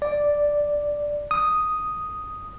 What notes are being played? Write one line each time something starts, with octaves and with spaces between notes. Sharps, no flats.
D5
D#6